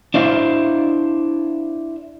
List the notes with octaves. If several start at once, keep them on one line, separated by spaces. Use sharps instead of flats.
D4 E4 C5 F5